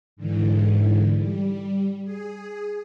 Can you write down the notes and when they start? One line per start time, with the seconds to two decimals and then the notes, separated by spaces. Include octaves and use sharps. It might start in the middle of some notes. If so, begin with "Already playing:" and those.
0.16 G#2 D3 E3
1.18 G3
2.04 G#4